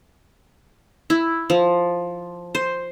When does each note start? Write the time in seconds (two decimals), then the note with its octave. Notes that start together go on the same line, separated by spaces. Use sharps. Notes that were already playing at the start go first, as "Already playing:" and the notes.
1.10 E4
1.50 F3
2.55 C5